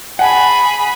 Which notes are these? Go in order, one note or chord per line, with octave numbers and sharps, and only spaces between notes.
G#4 F#5 G#5 A5 B5